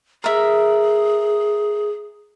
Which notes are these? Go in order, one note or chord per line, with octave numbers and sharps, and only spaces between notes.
G#4 A#4 E5